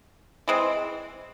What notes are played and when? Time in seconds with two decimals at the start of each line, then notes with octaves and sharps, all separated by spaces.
0.48 E3 G#3 C4